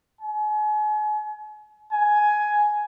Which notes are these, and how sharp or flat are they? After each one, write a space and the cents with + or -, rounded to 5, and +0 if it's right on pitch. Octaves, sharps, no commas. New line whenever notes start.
G#5 +35
G#5 +10